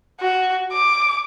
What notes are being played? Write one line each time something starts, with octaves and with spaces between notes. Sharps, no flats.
F#4
D6